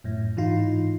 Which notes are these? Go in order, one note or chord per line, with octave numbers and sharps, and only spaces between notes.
F#2 A2
G#2 E3 D#4 F4